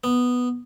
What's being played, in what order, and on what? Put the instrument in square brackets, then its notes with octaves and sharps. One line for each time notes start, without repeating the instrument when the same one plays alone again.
[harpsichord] B3